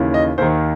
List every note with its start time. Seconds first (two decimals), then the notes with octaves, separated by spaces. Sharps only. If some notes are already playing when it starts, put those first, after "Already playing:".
Already playing: D#2 C#3 E3
0.14 D#5
0.38 D#2 D#3 C5